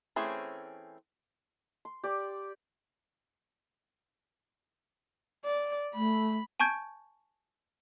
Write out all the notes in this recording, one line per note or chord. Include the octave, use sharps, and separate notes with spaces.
E3 A3 C4 C#4 G#4
C6
G4 D5
D5
A3 B5
G#5 A5 C#6 G6 G#6 D7